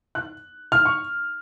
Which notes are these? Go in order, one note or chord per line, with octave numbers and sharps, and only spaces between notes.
F#6
F6
C#6